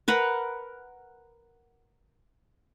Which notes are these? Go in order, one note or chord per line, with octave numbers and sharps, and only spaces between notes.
A#4 B4 F#5